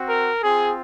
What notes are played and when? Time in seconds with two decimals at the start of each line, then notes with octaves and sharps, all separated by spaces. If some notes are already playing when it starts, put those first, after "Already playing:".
Already playing: C4 F#4
0.09 A#4
0.43 C4 F4 G#4